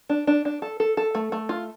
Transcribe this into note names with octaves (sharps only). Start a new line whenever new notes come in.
D4
D4
D4
A4
A4
A4
A3
A3
F4